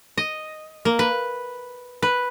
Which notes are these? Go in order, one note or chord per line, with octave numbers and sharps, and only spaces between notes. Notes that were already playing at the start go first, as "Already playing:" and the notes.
D#5
A#3
B4
B4